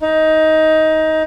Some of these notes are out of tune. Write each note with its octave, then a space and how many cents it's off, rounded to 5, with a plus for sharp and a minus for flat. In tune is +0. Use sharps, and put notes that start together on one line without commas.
D#4 +15